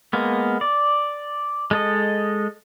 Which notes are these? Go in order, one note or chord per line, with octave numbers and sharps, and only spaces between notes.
G#3 A#3 B3
D5
G#3 A4 D#5